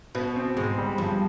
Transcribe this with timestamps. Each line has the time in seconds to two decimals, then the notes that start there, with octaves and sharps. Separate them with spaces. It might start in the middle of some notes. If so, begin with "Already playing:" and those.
0.15 B2 B3
0.36 C4
0.57 G#2 G#3
0.78 G3
0.98 G2 F3